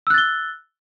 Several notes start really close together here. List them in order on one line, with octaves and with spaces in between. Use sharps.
E6 F#6 A6 G7